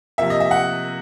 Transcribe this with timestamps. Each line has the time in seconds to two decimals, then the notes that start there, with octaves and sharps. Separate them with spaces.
0.18 C3 F3 A#3 E5
0.30 D#5
0.40 E5
0.51 F#5